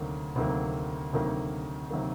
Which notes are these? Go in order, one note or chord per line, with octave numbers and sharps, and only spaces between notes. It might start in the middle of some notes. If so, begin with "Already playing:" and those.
Already playing: D2 C3 D#3 F#3 A#3
D2 C3 D#3 F#3 A#3
D2 C3 D#3 F#3 A#3
C3 D#3 F#3 A#3